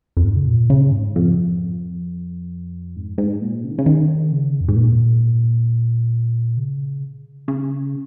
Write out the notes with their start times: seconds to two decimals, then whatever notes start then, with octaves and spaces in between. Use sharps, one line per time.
0.17 F2
0.24 G#2
0.36 C#3
0.47 A#2
0.70 C#3
0.92 G#2
1.16 F2
2.96 G#2
3.18 G#2
3.42 A#2
3.64 C#3
3.71 D#3
3.78 C#3
3.86 D#3
4.32 C#3
4.61 F2
4.68 G#2
4.76 A#2
6.57 C#3
7.48 C#3